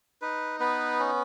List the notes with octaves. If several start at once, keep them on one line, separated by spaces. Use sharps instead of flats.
D#4 B4
B3 B4
C#4